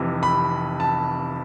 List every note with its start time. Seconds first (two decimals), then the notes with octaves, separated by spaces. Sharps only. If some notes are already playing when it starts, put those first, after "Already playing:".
Already playing: F1 F2 C3 E3
0.23 B5
0.80 A5